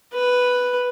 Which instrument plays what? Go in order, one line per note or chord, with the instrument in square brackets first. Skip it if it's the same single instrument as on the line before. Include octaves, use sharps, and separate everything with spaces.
[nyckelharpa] B4